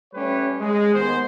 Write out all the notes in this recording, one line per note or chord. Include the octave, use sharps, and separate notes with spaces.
G3 A3 C#4 G4 B4 C#5
G#3
D#2 D#3 B3 C5